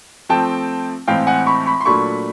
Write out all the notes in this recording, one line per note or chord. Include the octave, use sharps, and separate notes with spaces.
F3 A3 C4 G5 A5
A2 E3 G#3 C4 F5 G5
F#5 G#5
B5 C#6
B5 C#6
C6
A#2 F#3 A3 D4 B5 C#6